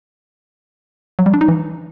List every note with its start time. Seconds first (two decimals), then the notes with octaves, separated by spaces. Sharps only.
1.19 F#3
1.26 G3
1.34 D4
1.41 D#4
1.48 E3